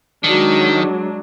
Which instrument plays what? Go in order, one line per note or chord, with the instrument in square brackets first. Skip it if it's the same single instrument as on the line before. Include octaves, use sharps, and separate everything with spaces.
[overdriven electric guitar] D#3 [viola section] F#3 G#3 D4